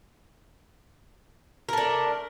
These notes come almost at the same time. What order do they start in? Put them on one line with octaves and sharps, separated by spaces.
A#4 A3 D4